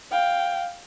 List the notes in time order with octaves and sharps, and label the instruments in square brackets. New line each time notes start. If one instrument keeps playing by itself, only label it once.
[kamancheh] F5 G5